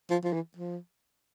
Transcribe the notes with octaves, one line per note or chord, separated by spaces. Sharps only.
F3
F3
E3
F3